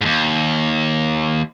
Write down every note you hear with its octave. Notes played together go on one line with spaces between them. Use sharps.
D#2 G#2